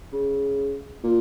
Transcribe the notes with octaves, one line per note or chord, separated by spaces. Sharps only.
C#3
A#2